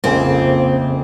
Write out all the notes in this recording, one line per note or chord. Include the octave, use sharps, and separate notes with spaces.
A#1 F2 C#3 A#3 C4 G#5